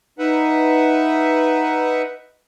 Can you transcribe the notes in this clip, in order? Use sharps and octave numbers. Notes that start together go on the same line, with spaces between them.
D#4 B4 E5 F#5